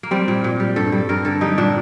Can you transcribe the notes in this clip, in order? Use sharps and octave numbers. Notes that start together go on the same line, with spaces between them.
A#3
G3 C4
A#2
A#2
G3
G2 A4
G3
G2 A#4
D3 A4
G3 D#4
A#2 D4